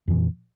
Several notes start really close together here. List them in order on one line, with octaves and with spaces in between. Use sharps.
F2 E3 A#2